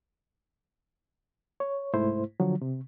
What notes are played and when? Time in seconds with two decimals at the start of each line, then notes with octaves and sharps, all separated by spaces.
1.60 C#5
1.94 C2 G#2 A3 E4 C5
2.40 D3 F3 F#3
2.61 C3